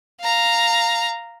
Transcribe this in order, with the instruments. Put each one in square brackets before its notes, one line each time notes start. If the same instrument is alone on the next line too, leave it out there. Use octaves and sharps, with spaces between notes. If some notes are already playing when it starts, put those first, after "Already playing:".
[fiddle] F5 A#5